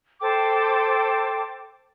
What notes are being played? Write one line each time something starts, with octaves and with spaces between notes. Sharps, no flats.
A4 C5 G5 D6